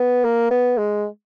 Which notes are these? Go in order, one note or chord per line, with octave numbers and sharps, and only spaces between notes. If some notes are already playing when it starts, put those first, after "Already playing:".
Already playing: B3
A#3
B3
G#3